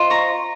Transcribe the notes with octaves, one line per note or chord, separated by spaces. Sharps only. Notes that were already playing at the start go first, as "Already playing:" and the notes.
Already playing: F4 C5 D#5
A#5 C#6